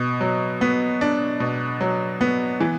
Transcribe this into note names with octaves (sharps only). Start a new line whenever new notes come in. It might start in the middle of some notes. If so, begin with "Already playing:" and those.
Already playing: B2
F#3
B3
D4
B2
F#3
B3
E3